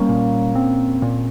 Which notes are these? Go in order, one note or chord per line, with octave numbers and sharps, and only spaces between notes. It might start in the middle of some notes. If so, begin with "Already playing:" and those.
Already playing: G3 A#3 C#4
A#2
C4
A#2